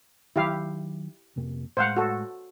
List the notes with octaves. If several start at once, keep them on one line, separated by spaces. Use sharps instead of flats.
D#3 F#3 E4 G4 F5
F2 C3 A#3
A2 G#3 C5 F5 F#5
F#4 A4